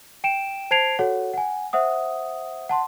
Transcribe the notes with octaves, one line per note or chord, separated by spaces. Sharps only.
G5 D7 E7
C5 A5 G#6 C7 D7 F7
F#4 A4 C#5 F#5
F#5 G#5
C5 E5 F#5 D#6
F#5 A5 C6